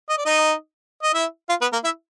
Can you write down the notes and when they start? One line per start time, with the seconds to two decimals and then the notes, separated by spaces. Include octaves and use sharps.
0.09 D#5
0.18 D5
0.25 D#4 D#5
1.03 D#5
1.14 E4 E5
1.49 F4 F5
1.61 B3 B4
1.72 A#3 A#4
1.84 E4 E5